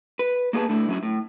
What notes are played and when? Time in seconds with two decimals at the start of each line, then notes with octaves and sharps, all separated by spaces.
0.19 B4
0.53 A#3 B3 G#4 B4 A5
0.69 D3 A3 E4
0.89 F#3 C#4 E4
1.03 A2